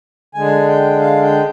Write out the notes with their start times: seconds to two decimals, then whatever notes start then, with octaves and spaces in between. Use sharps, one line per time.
0.34 D3 G#3 D4 G#5
0.68 G5
1.01 F5
1.23 G5